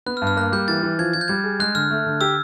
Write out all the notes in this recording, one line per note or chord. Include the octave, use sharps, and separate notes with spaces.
B3 F#6
F6
G2
F6
A#3 F#6
G3 G6
E3 A6
E3
F3 G#6
F3 G#6
G6
G3 G#6
G#4
G#3 F#6
D3 F6
A3
D3
G4 E6